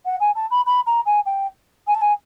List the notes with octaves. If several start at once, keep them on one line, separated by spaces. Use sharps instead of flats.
F#5
G#5
A5
B5
B5
A#5
G#5
G5
G#5
A5
G#5